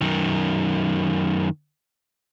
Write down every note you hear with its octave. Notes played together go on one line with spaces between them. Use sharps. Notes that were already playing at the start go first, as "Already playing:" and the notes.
F#2 D#3